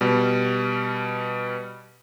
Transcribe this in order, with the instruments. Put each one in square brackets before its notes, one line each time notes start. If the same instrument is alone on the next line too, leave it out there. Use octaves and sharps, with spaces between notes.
[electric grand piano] B2 G3